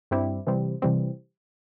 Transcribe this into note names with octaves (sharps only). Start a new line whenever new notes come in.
G2 G3 C4 E4 G4
C3 E3 G3 C4
C3 E3 G3 C4